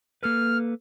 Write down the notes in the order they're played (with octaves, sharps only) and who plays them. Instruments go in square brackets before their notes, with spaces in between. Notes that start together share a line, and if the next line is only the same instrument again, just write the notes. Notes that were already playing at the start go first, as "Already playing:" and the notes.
[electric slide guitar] A#3 A4 B4 [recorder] F6